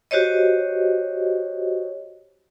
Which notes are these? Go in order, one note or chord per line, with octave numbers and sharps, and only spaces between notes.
F#4 G4 C5 C#5 D#5